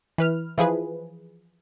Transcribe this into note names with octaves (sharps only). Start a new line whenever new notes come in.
E3 B4 F6
E3 F3 G#4 B4